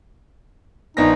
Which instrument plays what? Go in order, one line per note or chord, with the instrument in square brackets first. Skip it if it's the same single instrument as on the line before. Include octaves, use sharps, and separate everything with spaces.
[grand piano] A#1 B3 A#6 [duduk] D#4